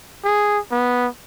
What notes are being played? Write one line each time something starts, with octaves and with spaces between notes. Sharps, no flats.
G#4
B3